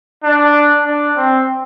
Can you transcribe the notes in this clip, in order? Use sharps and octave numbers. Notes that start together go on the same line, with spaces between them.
D4
D4
C4